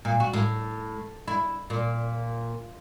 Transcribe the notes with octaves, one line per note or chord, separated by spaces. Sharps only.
A#2
F#4
A2
E4
A#2